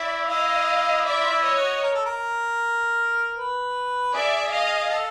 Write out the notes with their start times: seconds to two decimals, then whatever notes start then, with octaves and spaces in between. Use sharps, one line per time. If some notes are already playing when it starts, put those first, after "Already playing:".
Already playing: E4 D5 E5
0.28 E4 D#5 F5
1.05 E4 D5 E5
1.20 F4
1.31 E4
1.44 C#5 D#5
1.56 F#4
1.83 A#4
1.95 A4
2.06 A#4
3.36 B4
4.13 G#4 D5 E5
4.52 D#5 F5
4.90 A4